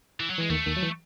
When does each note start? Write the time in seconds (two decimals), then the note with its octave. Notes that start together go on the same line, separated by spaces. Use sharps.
0.20 E3
0.30 F#3
0.38 E3 G#3
0.50 D#2 D#3 A3
0.66 D#2 D#3
0.77 F#3
0.83 E3